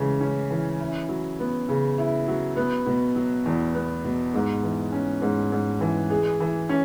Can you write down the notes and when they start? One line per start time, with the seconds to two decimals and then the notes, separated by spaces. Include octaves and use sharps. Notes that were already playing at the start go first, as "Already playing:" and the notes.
Already playing: C#3 E3 G#3 C#4
0.21 C#4
0.51 E3
0.79 E4
1.09 F#3
1.39 B3
1.69 C#3
1.98 E4
2.28 F#3
2.56 B3
2.86 B2
3.15 F#3
3.46 E2
3.75 B3
4.04 B2
4.34 G#2
4.63 E3
4.92 C#4
5.22 G#2
5.52 G#2
5.81 E3
6.10 G#4
6.40 E3
6.69 C#4